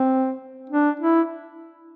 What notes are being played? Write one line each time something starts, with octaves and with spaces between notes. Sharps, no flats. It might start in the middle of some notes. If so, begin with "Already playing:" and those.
Already playing: C4
D4
E4